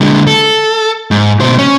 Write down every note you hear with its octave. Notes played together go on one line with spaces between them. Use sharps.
D3 G#3
A4
G#2
B2 C5
C#4